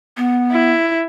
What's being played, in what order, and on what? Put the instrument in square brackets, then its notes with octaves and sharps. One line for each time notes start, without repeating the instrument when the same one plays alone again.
[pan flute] B3
[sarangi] E4